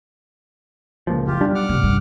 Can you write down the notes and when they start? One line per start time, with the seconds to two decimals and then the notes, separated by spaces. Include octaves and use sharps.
1.07 C#2 A#2 F3
1.27 F#1 F4 G4
1.41 B1 G3 D4
1.55 F#5 D6 F6
1.69 G2 C3
1.84 C2 G2